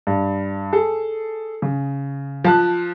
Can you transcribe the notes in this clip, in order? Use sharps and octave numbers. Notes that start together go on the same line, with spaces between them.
G2
G#4 A4
C#3
F3 A5 F#6